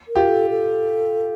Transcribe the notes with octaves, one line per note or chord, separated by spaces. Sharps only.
A#4
F4 G4
A4
A4